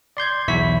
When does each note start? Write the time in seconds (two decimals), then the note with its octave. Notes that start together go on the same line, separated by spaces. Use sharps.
0.17 D5 C6 G6 G#6
0.48 B1 E2 E4 C#6 B6